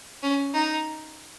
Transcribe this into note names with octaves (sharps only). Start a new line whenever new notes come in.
C#4
D#4